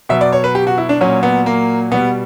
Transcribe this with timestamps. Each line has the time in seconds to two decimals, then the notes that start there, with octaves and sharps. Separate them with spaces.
0.09 B2 F#3 E5
0.21 D5
0.33 C#5
0.44 B4
0.55 G4
0.67 F#4
0.78 E4
0.89 D4
1.01 A#2 F#3 C#4
1.23 B3
1.46 A#3
1.92 B2 G3 B3